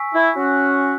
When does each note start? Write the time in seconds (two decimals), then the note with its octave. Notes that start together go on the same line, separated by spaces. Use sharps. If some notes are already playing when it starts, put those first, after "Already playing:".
Already playing: G#5 C#6 E6 B6
0.13 E4
0.35 C#4 F#4